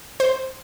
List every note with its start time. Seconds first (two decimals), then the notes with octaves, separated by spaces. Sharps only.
0.20 C5